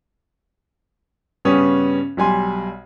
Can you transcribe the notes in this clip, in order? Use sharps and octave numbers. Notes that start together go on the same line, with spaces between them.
G2 C#3 G3 B3 C#4 D#6
B1 G3 G#5 C6